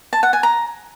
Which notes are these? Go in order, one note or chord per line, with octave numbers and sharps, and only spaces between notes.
A5
F#5
G#5
A#5